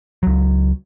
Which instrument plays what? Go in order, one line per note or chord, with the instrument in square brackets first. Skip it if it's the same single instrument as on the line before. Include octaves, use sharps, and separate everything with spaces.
[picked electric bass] C#2 F#3